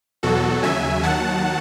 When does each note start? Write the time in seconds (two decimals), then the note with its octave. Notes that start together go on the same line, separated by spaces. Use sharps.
0.23 E2 B2 F#3 F#4 A4
0.62 D#2 C#3 F#3 E5 G#5
1.03 D#2 D#3 F#3 F#5 A5